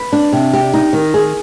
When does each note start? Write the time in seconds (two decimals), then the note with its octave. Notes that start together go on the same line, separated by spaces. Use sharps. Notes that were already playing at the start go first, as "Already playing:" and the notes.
Already playing: B4
0.13 D4
0.33 C3
0.53 G4
0.74 D#4
0.93 D#3
1.14 G#4